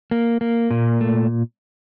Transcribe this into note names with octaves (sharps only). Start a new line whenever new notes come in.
A#3
A#3
A#2
A3